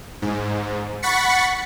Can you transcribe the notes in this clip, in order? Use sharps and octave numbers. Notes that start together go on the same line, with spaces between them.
G#2
F#5 B5 C#6 A6 B6 C#7